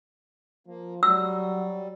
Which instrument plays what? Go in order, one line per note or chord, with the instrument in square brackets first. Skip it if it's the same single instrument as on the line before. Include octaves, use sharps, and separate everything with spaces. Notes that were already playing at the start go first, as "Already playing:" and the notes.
[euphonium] F3 [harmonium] A#3
[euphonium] F#3 [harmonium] G3 [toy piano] E6